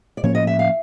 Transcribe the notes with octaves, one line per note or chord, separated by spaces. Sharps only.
D5
A2 F3 A#3 C#4 C#5
D#5
E5
F5